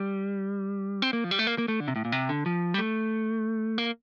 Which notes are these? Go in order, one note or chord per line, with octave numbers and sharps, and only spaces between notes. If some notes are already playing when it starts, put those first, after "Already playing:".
Already playing: G3
C4
A#3
F3
G3
A3
A#3
A#3
A3
D3
C3
A2
A#2
C3
D3
F3
G3
A3
A#3